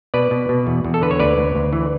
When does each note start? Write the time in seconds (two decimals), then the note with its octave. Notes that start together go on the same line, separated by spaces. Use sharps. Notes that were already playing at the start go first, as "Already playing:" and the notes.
0.14 B2 B4 D5
0.31 B2
0.49 B2
0.67 E2
0.85 E2
0.94 A4
1.01 D3 B4
1.11 C#5
1.19 D2 B4 D5
1.38 D2
1.55 D2
1.73 E3